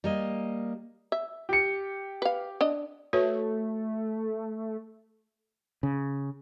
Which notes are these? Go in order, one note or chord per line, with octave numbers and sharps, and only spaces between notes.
G3 A#3 D#5
E5
G4 C#7
B4 F5
D4 D#5
A3 F#4 B4 C#5
C#3